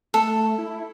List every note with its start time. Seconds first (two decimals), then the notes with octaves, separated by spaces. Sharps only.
0.14 A3 A4
0.58 E4